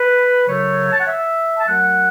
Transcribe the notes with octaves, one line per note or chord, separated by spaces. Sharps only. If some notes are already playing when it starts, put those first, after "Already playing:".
Already playing: B4
F#2 C#3 F#3 A3 C#5
A5
F#5
E5
A5
F#2 F#3 A3 F#5